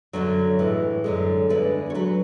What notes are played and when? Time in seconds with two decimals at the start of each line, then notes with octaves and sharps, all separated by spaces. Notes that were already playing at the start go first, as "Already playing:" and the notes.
0.13 F#2 D3 F#3 C#5
0.59 A2 E3 G#3
1.04 F#2 D3 G#3
1.49 E2 D3 G#3 B4
1.90 C#5
1.95 F#3 B4